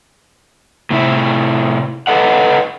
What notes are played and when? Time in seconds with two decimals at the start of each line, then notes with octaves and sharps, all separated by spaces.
0.91 A2 C3 E4
2.07 G4 A4 B4 D#5 F#5